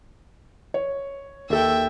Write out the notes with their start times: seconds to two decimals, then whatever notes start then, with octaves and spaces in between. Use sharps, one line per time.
0.74 C#5
1.50 D#2 A4 E5 G5